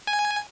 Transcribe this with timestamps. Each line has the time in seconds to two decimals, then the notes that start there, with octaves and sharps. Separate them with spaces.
0.07 G#5